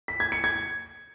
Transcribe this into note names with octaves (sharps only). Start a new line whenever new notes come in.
B6
G#6
C#7
G#6